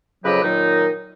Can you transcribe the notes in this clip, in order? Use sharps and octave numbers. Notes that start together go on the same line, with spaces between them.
F2 C#3 F#3 G4 B4 D#5
A#2 D#3 F#3 D#4